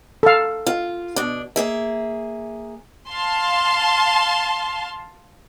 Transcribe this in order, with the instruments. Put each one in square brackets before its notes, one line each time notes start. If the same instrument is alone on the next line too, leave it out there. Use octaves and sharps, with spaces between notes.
[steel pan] A4 F5
[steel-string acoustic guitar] F4
B2 D4
A#3 G#4 E5
[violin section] F5 A5 C6